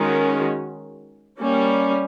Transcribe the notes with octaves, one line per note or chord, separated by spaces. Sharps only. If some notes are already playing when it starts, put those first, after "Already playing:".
Already playing: D#3 G#3 C#4 F#4
G3 A#3 C#4